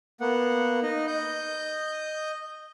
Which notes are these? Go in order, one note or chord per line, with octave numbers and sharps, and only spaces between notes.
A#3 B3 F#5
D#4 D#5
D#5 G6